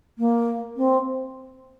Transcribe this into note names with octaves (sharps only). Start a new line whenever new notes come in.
A#3
C4